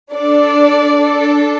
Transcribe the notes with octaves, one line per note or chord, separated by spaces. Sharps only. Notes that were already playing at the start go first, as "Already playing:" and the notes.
D4 A4 D5
D4 A4